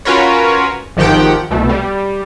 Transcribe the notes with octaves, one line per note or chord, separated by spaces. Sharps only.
C#4 F4 F#4 A#4 B4 C#5
G#1 D#3 F3 G4 F#5 G5
C2 B2 A3
G3